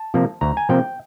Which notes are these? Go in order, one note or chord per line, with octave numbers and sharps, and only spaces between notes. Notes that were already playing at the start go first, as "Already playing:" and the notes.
Already playing: A5
C3 F3 A#3
D2 A#5
G#5
C3 F3 A#3 G5